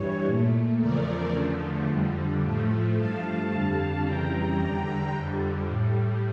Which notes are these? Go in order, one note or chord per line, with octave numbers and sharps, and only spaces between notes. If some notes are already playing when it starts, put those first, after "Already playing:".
Already playing: G2 E3 G3 C#5
A#2 A3
E2 C#3 F3 A3 A#4 D5
E2 D3 F3 A3
F2 D3 G3
A2 F3 A3
G2 F3 A3 F5 A5
F2 D3 G3 F5 A5
F2 C#3 E3 G3 G5 A#5
E2 D3 G3 G5 A#5
F2 D3 G3
A2 G3